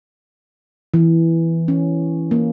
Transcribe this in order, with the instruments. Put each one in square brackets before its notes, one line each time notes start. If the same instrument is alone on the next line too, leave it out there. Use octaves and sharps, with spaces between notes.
[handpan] E3
C#4
A#3